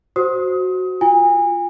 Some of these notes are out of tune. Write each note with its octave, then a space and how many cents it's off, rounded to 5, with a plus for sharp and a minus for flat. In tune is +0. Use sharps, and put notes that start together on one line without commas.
F#4 +0 C5 +0 D#6 +25
F4 -5 G#5 -30